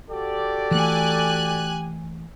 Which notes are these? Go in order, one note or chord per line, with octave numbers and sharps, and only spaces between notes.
F#4 G4 A4 D5
E3 A3 G#5 F#6